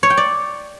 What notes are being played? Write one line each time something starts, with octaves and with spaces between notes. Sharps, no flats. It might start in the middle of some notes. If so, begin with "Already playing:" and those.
C#5
G5
D5